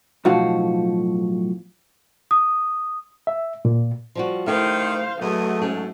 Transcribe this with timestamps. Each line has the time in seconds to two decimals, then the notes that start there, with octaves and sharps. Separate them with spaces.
0.25 B1 A2 F3 F#4 F5 F#5
2.31 D#6
3.27 E5
3.65 A#2
4.15 F3 G3 F#4
4.46 D#3 A3 E4 G4 C5 F5
5.21 E2 F#3 A3 B3 G#4 D#5
5.62 G#2 G#3 C#4 G#4